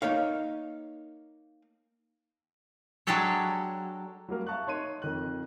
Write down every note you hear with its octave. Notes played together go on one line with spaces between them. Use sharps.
A#3 D#4 A#4 C#5 F5
F#3 G#3 D4 G4 A4 C#5
F#3 G3 A#3 A#4
E5 F5 A5 C#6 F#6
D#4 C#5 C6 D#7
F2 D#3 F#6